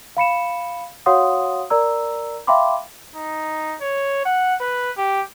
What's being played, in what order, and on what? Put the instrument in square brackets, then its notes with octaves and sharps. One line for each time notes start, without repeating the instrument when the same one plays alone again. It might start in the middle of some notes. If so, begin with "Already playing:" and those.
[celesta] F5 B5 C#7 E7
F#4 C#5 F5 F#5 C6 D#6
A#4 D5 A#5 E6
E5 F5 G5 B5 C6 D6
[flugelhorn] D#4
C#5
F#5
B4
G4